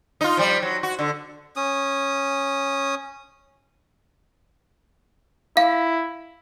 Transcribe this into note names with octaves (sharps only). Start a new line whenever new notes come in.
D#4 F4
F3 G3
F#3
F#4
D3
C#4 D#6
E4 F5